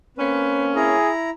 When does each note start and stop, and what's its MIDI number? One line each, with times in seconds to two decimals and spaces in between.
0.18 0.95 58
0.18 0.95 60
0.18 0.95 61
0.18 0.64 71
0.76 1.30 64
0.76 1.11 68
0.76 1.30 82